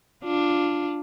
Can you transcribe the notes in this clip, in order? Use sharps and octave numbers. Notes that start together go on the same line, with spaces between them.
D4 F4